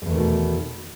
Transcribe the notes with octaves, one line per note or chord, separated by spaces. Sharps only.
E2 G#2 B2 D#3 A3